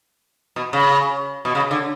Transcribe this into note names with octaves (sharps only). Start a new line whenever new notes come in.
B2
C#3
B2
C#3
D3